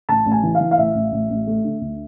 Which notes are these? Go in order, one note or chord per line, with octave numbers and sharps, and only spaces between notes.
A1 A5
A1
G#5
E3
F5
E3
F5
A1 E5
A1
A1
A1
A3
D3
D2